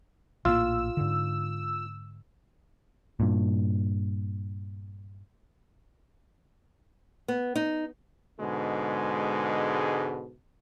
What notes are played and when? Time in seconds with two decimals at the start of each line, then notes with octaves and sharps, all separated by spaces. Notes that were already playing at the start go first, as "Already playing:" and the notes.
0.45 A#1 A2 A#3 F4 E6
0.97 G#2 D3
3.20 G2 A#2
7.28 B3
7.56 D#4
8.39 G#2 B2 D3 G#3